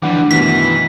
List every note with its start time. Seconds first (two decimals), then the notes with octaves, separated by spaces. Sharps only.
0.02 E3 F3 G3 A3 D4 F#5 D6
0.31 F#2 B2 D#3 E3 B6